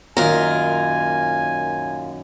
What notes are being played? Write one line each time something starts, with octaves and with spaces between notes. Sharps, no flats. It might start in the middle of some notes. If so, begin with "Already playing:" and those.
F#2 A#2 D#3 F4 A#4 G#5